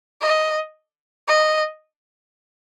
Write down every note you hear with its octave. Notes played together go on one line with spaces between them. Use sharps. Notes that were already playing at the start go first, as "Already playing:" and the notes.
D#5
D#5